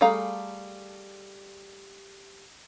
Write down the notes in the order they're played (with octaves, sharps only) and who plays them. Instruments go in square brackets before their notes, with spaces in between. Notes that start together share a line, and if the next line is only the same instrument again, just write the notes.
[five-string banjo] G3 A3 G#4 F5 A#5